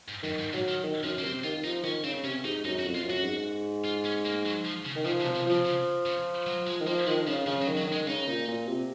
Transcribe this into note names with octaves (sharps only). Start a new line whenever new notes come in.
G#2
F#2 D#3
G#2
A#2 F#3
D#3
D#3
F#2 F3
A#3
C3 C4
D#3 F4
D#3
F3 D#4
D#3 C#4
C#3 C4
C3 C#4
G#2 D#4
F#2 D#4
F#4
F2
F4
F#2
F#4
G#2
F4
C#4
A#3
F#3
F3
C#3
D#3
C#3 F3
C3
F3
C3
C#3 F3
C#3
C#3
F#3
G#3
D#3
F3 A#3
D#3 G#3
D#3
C#3 F3
C#3 F3
F#3
D#3
F#3
D#3
G#3
C#3 D#4
A#2
A#2
C3